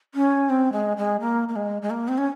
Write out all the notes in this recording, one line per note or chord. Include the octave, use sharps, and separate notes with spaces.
C#4
C4
G#3
G#3
A#3
A#3
G#3
G#3
A#3
C4
C#4